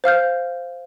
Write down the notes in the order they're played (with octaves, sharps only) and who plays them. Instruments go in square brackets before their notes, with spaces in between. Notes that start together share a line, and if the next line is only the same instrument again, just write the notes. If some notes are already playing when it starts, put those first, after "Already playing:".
[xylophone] C5 F5 F6 G6